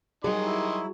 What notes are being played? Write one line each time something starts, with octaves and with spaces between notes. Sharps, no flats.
D#3 F#3 G3 G#4 D#5 C6
E4